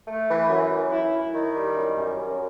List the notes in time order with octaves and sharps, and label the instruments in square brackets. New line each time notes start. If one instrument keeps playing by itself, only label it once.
[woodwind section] A3
E3
F#2
F#2
E4
E4
D#3
G3
F#2
F#2
F#2